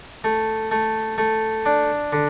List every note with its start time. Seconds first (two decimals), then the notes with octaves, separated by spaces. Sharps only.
0.24 A3
0.71 A3
1.18 A3
1.66 D4
2.12 D3